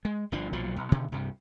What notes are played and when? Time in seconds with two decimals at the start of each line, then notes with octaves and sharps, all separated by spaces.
0.05 G#3
0.32 G1 D3 F3 D4
0.53 B1 A#2 F3 F#3
0.76 B1
0.92 B2 D3 D#3
1.12 C2 G2 C3